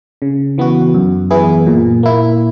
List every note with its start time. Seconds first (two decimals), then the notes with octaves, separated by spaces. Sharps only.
0.22 C#3
0.58 E3 B3 F#4
0.94 F#2
1.30 E3 B3 E4 G#4
1.67 A#2
2.03 A#3 E4